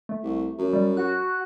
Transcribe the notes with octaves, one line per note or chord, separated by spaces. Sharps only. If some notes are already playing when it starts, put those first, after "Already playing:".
A3
C2
F#2
G3
F#4 F#6